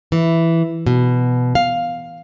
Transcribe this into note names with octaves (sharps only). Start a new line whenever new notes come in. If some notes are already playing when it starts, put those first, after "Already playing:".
E3
B2
F5